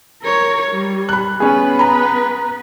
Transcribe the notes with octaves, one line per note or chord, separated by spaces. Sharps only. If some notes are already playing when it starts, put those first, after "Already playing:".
A#4 C#5
G3
B5 F#6
B3 C#4 G#4 B4
A#5 B5